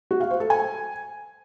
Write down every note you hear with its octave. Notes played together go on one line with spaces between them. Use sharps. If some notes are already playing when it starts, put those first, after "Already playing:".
F#4
F5
C5
A4
G#5